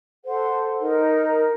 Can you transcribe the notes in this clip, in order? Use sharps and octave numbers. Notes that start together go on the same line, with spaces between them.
A4 C5 F#5
D#4 A#4